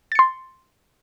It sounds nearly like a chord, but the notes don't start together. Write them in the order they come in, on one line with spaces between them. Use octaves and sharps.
A6 C#7 C6